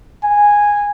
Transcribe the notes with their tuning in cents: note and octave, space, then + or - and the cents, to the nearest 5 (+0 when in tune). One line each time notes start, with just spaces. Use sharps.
G#5 -10